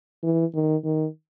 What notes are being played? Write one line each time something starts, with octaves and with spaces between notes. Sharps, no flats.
E3
D#3
D#3